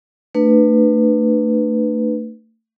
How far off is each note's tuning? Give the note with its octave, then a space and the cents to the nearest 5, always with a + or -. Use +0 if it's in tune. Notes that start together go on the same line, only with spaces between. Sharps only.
A3 +30 D4 +35 B4 +0